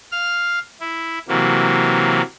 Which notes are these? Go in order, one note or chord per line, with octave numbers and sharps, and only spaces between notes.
F5 F6
E4
C3 E3 F#3 A#3